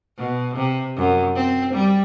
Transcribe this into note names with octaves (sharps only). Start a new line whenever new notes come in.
B2
C3
F#2
C4
G3